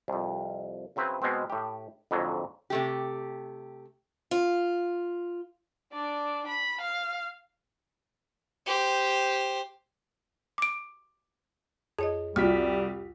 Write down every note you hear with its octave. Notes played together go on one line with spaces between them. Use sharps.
C2 F2
C#3 F#3 C4 E4 B4
B2 G#3 B3 C4
A2 G4
F2 G#2 D3 F#3
C3 A3 G4
F4
D4 D5
B5
F5
G4 C5
D6 D7
F2 G#4 C#5 D#5
C2 G3 F4 F#4 F6 B6